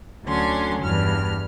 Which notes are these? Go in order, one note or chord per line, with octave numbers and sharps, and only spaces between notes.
D2 D3 F#3 C#4 C6
E2 G2 F6